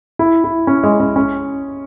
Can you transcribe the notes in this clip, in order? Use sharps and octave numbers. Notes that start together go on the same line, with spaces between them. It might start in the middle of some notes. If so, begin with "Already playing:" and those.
E4
E4
C#4
G#3
C#4
C#4